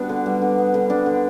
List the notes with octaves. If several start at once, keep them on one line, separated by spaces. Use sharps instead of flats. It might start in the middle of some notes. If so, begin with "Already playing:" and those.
Already playing: G3 B3 D4 F#4
D3
G3
D3
B3
D3
G3 D4
D3